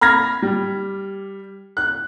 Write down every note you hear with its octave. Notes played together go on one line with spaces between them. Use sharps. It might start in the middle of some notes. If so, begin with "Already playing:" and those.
B5 F6 G#6 A#6
G3
F#6